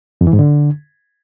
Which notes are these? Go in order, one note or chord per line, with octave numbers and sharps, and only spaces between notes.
F2
E3
G#2
D3